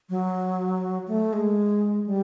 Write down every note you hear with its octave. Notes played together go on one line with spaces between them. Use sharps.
F#3
A3
G#3
G3